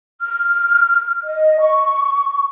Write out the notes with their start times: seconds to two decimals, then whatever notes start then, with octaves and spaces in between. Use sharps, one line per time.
0.21 F6
1.25 D#5
1.60 C#6